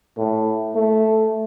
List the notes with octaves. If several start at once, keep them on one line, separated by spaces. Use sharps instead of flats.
A2
A3